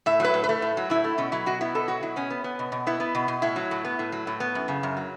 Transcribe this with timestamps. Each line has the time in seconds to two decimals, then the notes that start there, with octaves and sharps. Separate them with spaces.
0.06 A2 E5
0.20 F#3 B4
0.34 A2
0.44 B4
0.49 A3
0.62 A2
0.77 F#3
0.90 A2 E4
1.04 A3
1.18 B2 C#4
1.32 F#3 E4
1.46 B2 F#4
1.61 B3 E4
1.75 B2 A4
1.88 F#3 F#4
2.03 B2 E4
2.16 B3 C#4
2.30 B3
2.44 B3
2.59 B2
2.72 B2
2.87 B3 E4
3.00 B3
3.15 B2
3.28 B2
3.42 A2 E4
3.56 F#3
3.71 A2
3.85 B3
3.99 A2
4.12 F#3
4.27 A2
4.40 B3
4.55 F#2
4.68 C#3
4.83 F#2
4.97 F#3